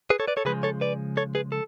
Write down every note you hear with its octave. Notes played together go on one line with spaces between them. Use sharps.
G#4 B4
A4 C#5
B4 D5
A4 C#5
C#3 F3 G#3 G#4 B4
A4 C#5
B4 D5
A4 C#5
G#4 B4
A4